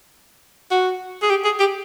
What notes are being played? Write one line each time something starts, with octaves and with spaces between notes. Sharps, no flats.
F#4
G#4
G4
G#4
G4